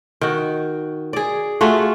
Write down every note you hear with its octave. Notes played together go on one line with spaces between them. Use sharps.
D#3 F#4
G#4 D5
A3 F4 F#4 G#4